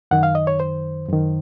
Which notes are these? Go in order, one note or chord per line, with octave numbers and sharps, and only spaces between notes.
F#2 D#3 F#5
F5
D#5
C#5
C5
F#2 D#3